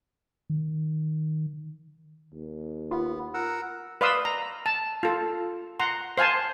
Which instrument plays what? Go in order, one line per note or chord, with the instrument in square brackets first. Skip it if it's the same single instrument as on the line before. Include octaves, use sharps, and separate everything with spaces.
[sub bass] D#3
[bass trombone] D#2
[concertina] B3 [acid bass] F4
[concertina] A#4 F#5 E6
[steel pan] B4 D5 F5 C6 D#6 E6
A#5
A5
F4 A4
F#5 A#5 C6
C5 F5 G#5 A5 C6